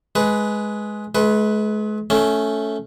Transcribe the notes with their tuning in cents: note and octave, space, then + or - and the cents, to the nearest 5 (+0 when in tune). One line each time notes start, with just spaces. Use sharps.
G#3 +15 B4 +0
G#3 +40 B4 +0
A3 -5 C#4 +5